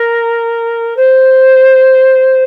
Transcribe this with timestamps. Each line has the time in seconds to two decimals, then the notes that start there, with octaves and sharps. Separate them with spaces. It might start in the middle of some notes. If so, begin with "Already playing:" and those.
Already playing: A#4
0.96 C5